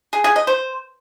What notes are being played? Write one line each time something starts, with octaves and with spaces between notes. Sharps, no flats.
G#4
G#4
D#5
C5